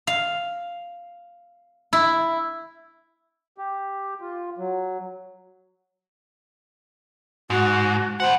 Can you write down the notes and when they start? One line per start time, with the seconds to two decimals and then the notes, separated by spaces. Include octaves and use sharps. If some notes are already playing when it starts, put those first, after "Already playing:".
0.07 F5
1.93 E4
3.58 G4
4.21 F4
4.58 F#3
7.50 G#2 F#4
8.20 G2 C5 F#5